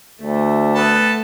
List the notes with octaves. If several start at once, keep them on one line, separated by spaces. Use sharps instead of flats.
D2 A3
B3 A4 B4